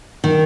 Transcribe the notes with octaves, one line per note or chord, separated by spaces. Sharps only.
D#3